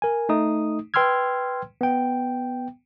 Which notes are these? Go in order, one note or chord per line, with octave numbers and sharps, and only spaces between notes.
A#4 G#5
A3 D#4 D#6
B4 G5 C6 E6 F6 G#6
B3 G5